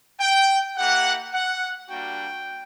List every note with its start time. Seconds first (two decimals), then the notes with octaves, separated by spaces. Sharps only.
0.20 G5
0.77 A#3 E4 G4 F#5
1.33 F#5
1.89 G3 A#3 D4 F#4 G5